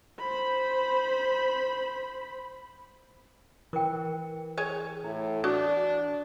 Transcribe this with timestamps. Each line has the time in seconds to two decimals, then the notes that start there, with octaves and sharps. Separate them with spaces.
0.19 C5 B5
3.73 E3 A#4 G5
4.57 G#4 C#5 G#5
5.04 A2 E4
5.44 D4 F#4 A4 D6 D#6